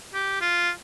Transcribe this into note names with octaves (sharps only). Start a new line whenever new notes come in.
G4
F4